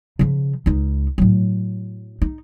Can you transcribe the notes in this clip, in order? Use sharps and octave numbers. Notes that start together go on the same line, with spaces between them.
C#3 F3
C#2 D#4
A2 F#3
D#4